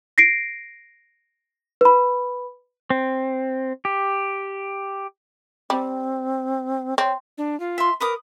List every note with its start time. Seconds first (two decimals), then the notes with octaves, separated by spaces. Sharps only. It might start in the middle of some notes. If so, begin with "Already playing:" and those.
0.18 A#6 C7 D7
1.81 B4 B5
2.90 C4
3.85 G4
5.70 G3 C4
6.98 C4 C#5
7.38 D4
7.60 F4
7.78 E5 C6
8.00 A#4 B4 D6 D#6